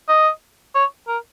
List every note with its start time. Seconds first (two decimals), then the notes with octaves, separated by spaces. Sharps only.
0.09 D#5
0.75 C#5
1.08 A#4